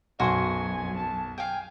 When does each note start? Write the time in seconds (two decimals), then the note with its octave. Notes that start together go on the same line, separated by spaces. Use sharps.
0.20 B1 F#2 F#4 C5 G#5 C6
0.97 A5
1.38 F5 G5 G#5